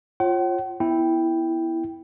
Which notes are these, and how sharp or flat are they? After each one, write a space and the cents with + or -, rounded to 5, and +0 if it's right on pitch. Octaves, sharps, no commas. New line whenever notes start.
F4 +0 C#5 -35 F#5 +45
B3 +0 E4 +0 G5 +0